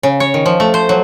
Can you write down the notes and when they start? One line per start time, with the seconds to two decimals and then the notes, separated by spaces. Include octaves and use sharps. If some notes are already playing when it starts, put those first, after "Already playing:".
0.03 C#3
0.20 C#5
0.34 D#3
0.46 F3
0.60 A3
0.74 C5
0.89 F#3